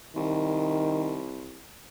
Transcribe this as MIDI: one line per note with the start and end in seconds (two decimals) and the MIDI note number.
0.16 1.63 36
0.16 1.24 51